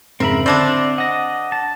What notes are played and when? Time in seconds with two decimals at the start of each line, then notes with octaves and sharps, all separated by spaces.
0.20 F2 G#2 C#3 C4 A#4 E5 B5
0.46 D3 D4 C5 D5 E6 A#6
0.98 D#5 F#5 A#6
1.52 A5